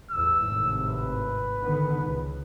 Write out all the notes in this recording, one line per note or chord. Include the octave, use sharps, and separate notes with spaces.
A1 E2 E6
G#1 A2 C3
B4
D3 D#3 B3
C#2